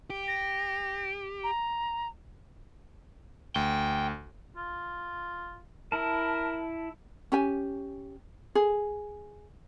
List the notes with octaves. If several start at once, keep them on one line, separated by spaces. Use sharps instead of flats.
G4
A#6
A#5
D2 G5
F4
E4 A#4 A5
C#4 G4 G#5
G#4